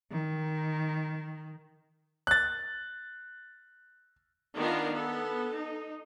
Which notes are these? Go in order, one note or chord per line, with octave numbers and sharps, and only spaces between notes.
D#3
F#6 A6
D#3 B3 D4 D#4 F4 F5
B3 A4
D#4